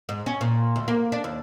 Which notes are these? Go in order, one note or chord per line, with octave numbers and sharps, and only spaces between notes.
G#2
C#4
A#2
D2
A#3
D4
D#2